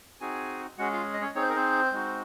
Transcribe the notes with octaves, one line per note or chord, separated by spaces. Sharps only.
C4 D#4 F#4 G#4 G#5
G#3 C#4 F#4 G#4 F#5
F4 F5
D#5
C#4 C#5
C4 D#4 G#4 C#5
C5
A#4
C4 C5
G#3 D#4 F#4